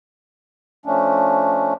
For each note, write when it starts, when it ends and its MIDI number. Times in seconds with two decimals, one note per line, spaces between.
0.86 1.74 53
0.86 1.74 57
0.86 1.74 61
0.86 1.74 62